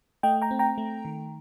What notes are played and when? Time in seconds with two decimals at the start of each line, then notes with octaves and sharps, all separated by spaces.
0.23 A3 D#5 G5
0.42 G5 A#5
0.51 C4
0.59 G5 A#5
0.78 A3
1.05 D#3